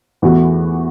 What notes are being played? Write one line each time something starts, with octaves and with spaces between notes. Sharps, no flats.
E2 E3 A3 F#4